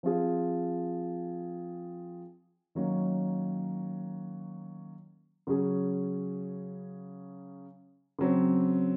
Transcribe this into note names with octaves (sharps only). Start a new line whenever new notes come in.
F3 C4 F4 G#4
D#3 F#3 A#3 C#4
C#3 F#3 C#4 G#4
C#3 F#3 C4